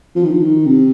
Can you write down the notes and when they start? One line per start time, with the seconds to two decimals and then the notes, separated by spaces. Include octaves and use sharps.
0.16 F3
0.24 D#3
0.31 F3
0.40 D#3
0.66 C3